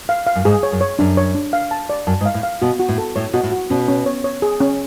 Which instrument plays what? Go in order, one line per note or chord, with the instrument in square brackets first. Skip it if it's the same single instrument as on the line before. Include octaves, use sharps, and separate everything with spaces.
[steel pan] F5
F5
[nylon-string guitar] F#2
[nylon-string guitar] G#2 [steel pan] G#4
[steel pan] C#5
[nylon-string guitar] F#2
[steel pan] C#5
[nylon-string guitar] F#2 [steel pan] D4
[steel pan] C#5
D4
F5
A5
D5
[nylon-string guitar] F#2 [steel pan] A5
[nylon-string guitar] G#2
[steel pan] F5
[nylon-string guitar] A2
[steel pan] F5
[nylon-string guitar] B2 [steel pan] F#4
[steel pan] F#4
[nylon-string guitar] A2
[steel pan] A4
[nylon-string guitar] A2 [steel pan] C#5
[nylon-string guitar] B2 [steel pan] F#4
[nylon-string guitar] A2
[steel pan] F#4
[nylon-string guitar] B2 [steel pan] C#4
[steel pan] C#4
C#5
C#5
G#4
C#4